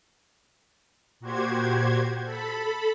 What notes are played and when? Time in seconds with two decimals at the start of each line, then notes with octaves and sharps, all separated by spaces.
1.20 A#2 F#4 G4 C5 G#6
2.23 A4 B5